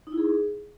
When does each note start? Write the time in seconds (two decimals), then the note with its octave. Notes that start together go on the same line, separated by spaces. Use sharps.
0.07 D#4
0.12 E4
0.18 G#4